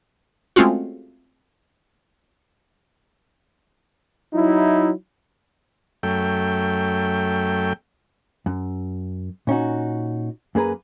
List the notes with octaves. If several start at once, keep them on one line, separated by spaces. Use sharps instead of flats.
G#3 A3 C4 C#4 F4 F#4
F#3 D#4 E4
F#2 A3 G5
F#2
A#2 C#4 D#4 F#4
F#2 A#3 G#4 B4 A#5